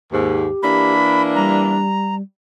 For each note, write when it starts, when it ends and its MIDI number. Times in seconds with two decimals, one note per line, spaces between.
0.12 0.47 39
0.12 0.47 44
0.12 0.93 67
0.63 1.84 52
0.63 1.84 58
0.63 1.84 62
0.63 1.22 83
1.36 2.21 55
1.36 2.15 82